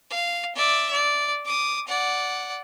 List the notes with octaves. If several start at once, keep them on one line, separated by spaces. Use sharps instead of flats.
F5
D5 E5
D5
D6 D#6
D5 F#5